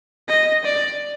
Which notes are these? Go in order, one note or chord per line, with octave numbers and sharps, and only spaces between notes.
D#5
D5